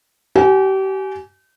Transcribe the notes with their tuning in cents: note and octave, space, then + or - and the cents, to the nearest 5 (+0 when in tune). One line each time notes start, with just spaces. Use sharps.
G4 -35 G#5 +10